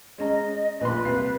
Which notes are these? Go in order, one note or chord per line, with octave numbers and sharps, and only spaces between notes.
G#3 C#4 D#5 A#5
A#1 A#2 B4 C6
C2 C7